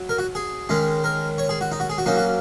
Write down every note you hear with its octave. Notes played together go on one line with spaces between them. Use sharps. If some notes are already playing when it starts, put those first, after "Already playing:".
Already playing: F#3
A#4
F#4
G#4
D#3 G#3 C#4
A#4
C#5
G#4
F#4
D#4
F#4
G#4
F#4
F#3 A#3 C#4 D#4
F#4